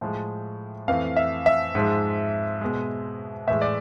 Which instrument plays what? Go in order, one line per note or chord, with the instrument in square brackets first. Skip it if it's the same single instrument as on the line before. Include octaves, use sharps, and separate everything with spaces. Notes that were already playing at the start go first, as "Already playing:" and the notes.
[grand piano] A2 F3 G#3
F2 E3 A3 F5
E5
E5
G#2 F3 G#3
B2 G#3
A2 E3 G#3 E5
D5